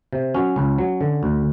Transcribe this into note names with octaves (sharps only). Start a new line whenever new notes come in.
C3
F#3 C#4
C#2
F#3
D3
D2